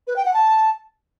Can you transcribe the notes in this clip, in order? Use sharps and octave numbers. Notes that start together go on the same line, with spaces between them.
B4
G5
F#5
A5